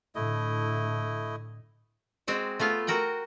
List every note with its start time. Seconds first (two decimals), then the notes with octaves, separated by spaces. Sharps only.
0.15 A2 D3 A3 E4 D#5
2.27 G#3 C4 F#4
2.59 A3 B3 F4 F5
2.87 F#4 A#4 F#5 G5